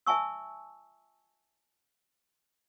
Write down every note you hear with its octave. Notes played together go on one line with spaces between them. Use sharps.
E5 G#5 A5 C#6 E6